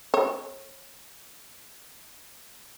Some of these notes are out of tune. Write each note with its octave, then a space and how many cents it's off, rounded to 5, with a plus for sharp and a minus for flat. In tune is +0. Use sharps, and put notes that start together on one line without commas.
C#5 -40